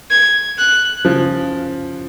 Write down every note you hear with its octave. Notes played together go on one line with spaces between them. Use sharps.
G#6
F#6
C#3 F3